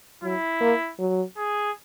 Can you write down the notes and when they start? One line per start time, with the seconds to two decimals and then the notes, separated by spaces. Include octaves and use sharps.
0.23 F#3 E4
0.61 A#3
0.99 F#3
1.37 G#4